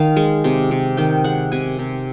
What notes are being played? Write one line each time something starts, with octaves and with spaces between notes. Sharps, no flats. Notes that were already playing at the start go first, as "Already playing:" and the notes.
Already playing: D#3 F5
G#3
C3
C3
D#3 G5
G#3 F#5
C3 G#5
C3